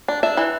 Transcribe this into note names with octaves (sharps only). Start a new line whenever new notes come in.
D4
D4 E5
E3